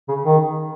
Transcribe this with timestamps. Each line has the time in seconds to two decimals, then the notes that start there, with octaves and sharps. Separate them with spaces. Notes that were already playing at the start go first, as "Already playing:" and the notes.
0.09 C#3
0.25 D#3